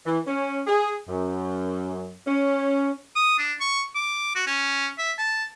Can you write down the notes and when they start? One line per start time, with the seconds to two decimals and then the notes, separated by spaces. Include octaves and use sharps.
0.06 E3
0.27 C#4
0.67 G#4
1.08 F#2
2.26 C#4
3.16 D#6
3.39 D4
3.61 C#6
3.95 D6
4.35 F#4
4.46 C#4
4.98 E5
5.18 A5